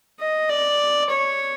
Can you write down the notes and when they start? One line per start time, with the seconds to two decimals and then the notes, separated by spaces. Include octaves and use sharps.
0.19 D#5
0.49 D5
1.09 C#5